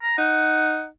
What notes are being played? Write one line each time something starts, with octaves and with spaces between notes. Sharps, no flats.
A#5
D#4 F#5